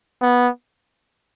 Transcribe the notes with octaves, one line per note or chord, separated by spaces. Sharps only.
B3